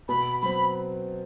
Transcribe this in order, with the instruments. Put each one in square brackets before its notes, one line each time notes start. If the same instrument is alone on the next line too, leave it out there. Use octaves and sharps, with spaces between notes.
[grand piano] B2 [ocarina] B5
[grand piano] F#3 C4 [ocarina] B5